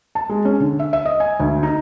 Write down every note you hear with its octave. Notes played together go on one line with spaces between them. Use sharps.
A5
G#3
C#4
D3
E5
E5
D#5
G#5
D2
D#4